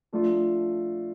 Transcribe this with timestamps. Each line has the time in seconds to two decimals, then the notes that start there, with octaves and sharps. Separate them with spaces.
0.13 F3 A3 D4 F4